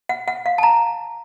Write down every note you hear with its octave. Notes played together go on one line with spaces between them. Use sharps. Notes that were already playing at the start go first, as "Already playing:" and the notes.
F#5
F#5
F5
A5
A#5